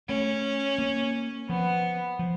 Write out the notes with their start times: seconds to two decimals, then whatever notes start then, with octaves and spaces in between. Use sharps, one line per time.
0.09 A3 C#4
0.78 A#3
1.49 F3 B3
2.19 F3